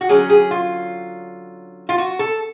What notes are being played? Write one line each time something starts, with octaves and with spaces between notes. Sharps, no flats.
F#4
D3 F#3 C#4 G#4
G#4
F4
F4
F#4
A4